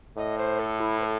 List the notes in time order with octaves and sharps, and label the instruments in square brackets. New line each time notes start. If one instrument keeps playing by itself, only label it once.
[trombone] A2 [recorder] D#5
[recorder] C5
A4
E4
C5
A4